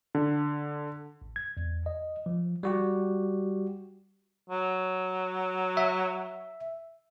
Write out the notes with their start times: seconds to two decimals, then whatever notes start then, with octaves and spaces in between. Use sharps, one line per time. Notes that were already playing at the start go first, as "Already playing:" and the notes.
0.15 D3
1.22 A1
1.36 G#6
1.57 E2
1.86 D#5
2.26 F3
2.63 G3 F#4 G4
4.50 F#3
5.77 E5